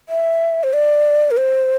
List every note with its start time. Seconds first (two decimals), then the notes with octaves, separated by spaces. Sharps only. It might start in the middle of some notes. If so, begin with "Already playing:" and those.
0.09 E5
0.63 C5
0.73 D5
1.31 A#4
1.37 C5